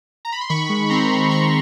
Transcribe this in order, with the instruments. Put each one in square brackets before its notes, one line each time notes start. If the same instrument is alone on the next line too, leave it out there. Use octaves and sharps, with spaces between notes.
[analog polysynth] A#5
B5
C6
D#3 B5 C#6
G#3
C4 A#5 C6
D#3
C4 B5 C#6